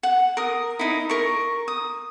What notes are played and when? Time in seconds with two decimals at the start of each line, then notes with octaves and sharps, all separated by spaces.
0.03 F#5
0.37 A#4 D#6
0.79 D#4 E4
1.10 A#4 C#6
1.68 D#6